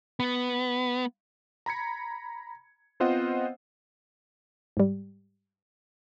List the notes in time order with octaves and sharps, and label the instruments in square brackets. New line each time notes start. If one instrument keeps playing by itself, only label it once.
[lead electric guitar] B3
[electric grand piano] A#5 B5 G#6 C#7
B3 C4 F4 C5 D#5 F#5
[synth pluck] G#2 G3